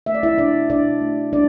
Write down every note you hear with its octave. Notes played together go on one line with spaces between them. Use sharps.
A3 E5
D5
E4 E5
B2 D4 D5
B2 D4 D5
A3
G#3 D4 D5